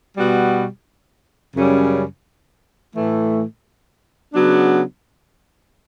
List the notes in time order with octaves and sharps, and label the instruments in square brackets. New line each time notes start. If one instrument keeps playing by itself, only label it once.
[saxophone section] B2 G3 B3 F#4
F#2 C#3 G3 C#4
A2 E3 A3
C#3 F#3 B3 D4